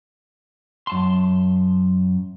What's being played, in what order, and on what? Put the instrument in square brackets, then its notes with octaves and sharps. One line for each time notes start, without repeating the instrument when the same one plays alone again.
[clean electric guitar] F#2 A5 C6